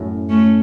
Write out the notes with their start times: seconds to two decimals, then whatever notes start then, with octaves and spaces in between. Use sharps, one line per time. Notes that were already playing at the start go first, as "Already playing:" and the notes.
Already playing: F#2 A2
0.29 A3 C#4